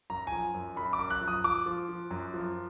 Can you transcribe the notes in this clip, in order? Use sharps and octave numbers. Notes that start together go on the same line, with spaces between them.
F#2 A#5
F3 G#5
F#2
F#2 B5
D6
F#2
F#6
F3
D#6
F3 D6
F3
F3
F#2
F3